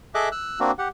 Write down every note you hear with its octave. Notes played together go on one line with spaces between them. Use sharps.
G#4 A4 D#5 E5 D6 F#6
E6 F#6
A#3 C4 D4 F#4
G4 F#5